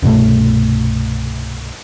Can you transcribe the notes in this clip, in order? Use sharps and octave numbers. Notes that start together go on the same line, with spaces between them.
C2 G2 B2 A3